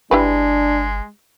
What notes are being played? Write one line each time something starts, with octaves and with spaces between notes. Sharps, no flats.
G1 G#3 D4 E4 G4 B4